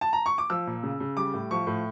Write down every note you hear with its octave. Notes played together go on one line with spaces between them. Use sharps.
A5
A#5
C#6
D6
F3 E6
A#2
C#3
C#3
G3 D6
A2
F3 C#6
A2